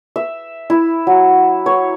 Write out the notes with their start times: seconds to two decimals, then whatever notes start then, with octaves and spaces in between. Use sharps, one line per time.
0.16 E5
0.70 E4
1.07 F#3
1.66 C#5